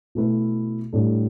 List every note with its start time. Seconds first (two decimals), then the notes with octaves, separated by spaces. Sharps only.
0.15 B2 A3 E4 B4
0.93 A2 G3 D4 A4